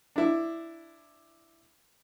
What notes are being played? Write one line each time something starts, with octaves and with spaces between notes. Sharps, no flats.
D4 E4